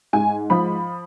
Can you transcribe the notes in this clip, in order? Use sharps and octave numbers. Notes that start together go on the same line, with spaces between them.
G#2 G#5
F3 B5